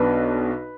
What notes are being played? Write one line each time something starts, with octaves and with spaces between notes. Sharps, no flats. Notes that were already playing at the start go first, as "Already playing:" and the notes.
Already playing: B1 B2 B3 D4 B4